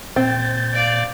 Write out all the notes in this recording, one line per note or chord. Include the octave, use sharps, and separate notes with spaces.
A#2 C4 G6 A6
D5 F5